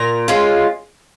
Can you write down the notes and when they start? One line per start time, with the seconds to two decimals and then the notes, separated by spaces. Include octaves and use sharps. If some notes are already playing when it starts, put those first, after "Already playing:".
Already playing: A#2 A#5
0.28 G#3 C#4 F4